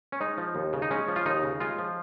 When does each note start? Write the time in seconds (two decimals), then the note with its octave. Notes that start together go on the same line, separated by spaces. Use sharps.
0.12 C#4
0.21 G#3 D#4
0.38 F3
0.55 D#2
0.73 C#3
0.82 D#4
0.91 G#3 C#4
1.08 F3
1.16 F4
1.26 D#2 D#4
1.43 C#3
1.60 G#3 F4
1.79 F3